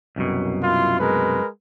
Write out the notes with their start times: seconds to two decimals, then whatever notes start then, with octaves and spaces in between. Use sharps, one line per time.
0.16 C2 F#2 B2
0.63 E4 F4 C6
0.99 G#3 A#4 B4